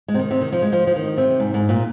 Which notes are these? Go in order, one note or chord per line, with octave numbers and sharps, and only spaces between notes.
G#3
C3
D#3
C3
D#3
F3
G#3
F3
F3
D#3
C3
G#2
G#2
A#2